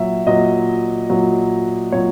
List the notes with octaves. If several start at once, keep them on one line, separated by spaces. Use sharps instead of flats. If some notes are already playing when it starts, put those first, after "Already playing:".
Already playing: A#2 F#3 E5
A#2 F#3 D#5
A#2 F#3
A#2 F#3 C#5